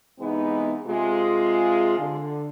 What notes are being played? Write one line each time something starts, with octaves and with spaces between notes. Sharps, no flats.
G#2 C3 E3 G#3 B3 D#4
C3 G#3 F4
D3